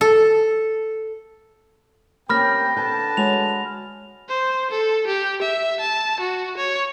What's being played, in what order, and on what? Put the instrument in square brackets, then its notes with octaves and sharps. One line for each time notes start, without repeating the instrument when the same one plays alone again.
[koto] A4
[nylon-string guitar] A#3 C#4 [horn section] C4 G4 G5 [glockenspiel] B5 F6 A#6
[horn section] D3 B4 A5 [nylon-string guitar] G5
[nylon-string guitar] G#3 F#4 C#5 [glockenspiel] F7
[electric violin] C5
A4
G4
E5
A5
F#4
C#5